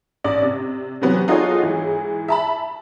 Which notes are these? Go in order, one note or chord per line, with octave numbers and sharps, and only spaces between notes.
A1 D5
C3
C3 E3 F#3 B3 C4
D#4 F4 F#4 G#4 A4 C#5
G#2 E3
E5 A5 B5